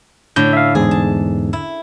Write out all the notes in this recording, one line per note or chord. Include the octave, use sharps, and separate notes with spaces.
A2 D3 G6
E5 F5
E2 G#2 G#4
A5
E4